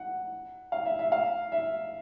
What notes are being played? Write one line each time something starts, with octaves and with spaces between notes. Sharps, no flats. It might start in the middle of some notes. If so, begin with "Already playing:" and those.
Already playing: F#5
F5
E5
E5
F5
E5